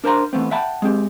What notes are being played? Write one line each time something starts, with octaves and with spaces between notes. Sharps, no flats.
D4 A#4 C5 A5 A#5 C6
E3 A3 B3 C4
E5 F#5 G5 A5 B5
G#3 C4 G4